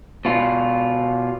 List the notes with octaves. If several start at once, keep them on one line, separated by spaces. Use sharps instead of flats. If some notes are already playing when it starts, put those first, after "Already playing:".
B2 F4